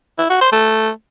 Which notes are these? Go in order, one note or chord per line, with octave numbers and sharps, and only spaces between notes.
E4
F#4
C5
A3